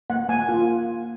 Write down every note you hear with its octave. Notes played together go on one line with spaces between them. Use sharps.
A#3 F#5
A#3 G#5
F4